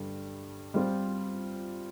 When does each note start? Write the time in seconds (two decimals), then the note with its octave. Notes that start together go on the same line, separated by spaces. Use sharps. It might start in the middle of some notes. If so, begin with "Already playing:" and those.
Already playing: G2 D3 G3
0.74 G3 C4 F4 C5